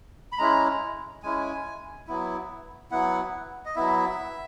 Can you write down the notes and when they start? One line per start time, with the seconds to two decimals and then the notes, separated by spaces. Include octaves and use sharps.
0.32 B5
0.39 G#3 C#4 E4 A#5
1.23 G#3 C#4 E4 G#5
2.08 F#3 B3 E4
2.91 F#3 B3 E4 F#5
3.66 D#5
3.76 F#3 B3 E4 E5